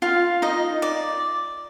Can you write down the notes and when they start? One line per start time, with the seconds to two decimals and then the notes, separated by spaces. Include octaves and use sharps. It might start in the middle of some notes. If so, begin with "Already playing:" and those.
0.02 F4 F5
0.42 D#4 D#5
0.82 D5